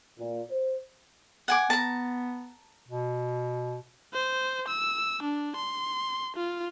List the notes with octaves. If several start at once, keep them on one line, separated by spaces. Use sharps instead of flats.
A#2
C5
F#5 G#5 D6
B3 A5 A#5
B2
C5
E6
D4
C6
F4